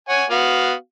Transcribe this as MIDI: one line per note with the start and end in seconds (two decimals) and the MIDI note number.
0.09 0.24 73
0.09 0.24 78
0.09 0.24 80
0.30 0.73 59
0.30 0.73 66
0.30 0.73 77